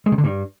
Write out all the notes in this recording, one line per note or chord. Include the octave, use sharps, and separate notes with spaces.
G#3
C3
D3
G2